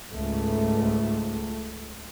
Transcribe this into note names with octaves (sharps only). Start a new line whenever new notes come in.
C#2 G#2 A3